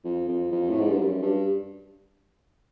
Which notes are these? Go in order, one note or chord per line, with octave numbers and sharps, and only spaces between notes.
F2
F2
F2
A2
G#2
G2
F#2
G2